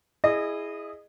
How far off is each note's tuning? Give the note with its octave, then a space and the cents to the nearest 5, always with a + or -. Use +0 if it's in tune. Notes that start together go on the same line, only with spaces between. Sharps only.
E4 +0 G#4 +0 D#5 -25